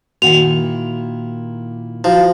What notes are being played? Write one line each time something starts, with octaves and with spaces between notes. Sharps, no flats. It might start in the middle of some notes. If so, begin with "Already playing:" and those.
A#2 D#3 E4 F#4 F#5 G5 F7
F3 E4 F#4